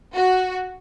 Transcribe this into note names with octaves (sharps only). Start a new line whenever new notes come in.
F#4